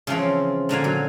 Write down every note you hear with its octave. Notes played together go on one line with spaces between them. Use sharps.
C#3 E3 F3 C4
A#2 D3 F5 G#5
F#3